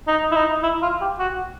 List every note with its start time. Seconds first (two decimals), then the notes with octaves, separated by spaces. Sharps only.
0.08 D#4
0.31 E4
0.36 D#4
0.63 E4
0.82 F4
1.01 G4
1.19 F#4